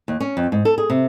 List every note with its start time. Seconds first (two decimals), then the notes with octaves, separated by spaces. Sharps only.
0.08 D#2
0.20 C#4
0.37 F2
0.52 G#2
0.65 A4
0.78 G#4
0.90 C3